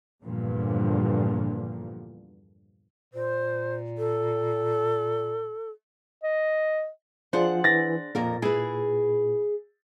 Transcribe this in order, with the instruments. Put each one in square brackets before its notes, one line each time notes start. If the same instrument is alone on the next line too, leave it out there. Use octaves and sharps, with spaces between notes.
[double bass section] E2 G2 A#2 D3 F3
[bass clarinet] A#2 [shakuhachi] C5
[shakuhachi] A4
[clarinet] D#5
[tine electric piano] F3 F4 [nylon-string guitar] D4 G#4 C5 [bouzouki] F#5
[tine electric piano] E3 [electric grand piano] A6 A#6
[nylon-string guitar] F2 A#3 A#4 [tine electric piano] A#2
[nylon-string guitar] E4 B4 [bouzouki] G#4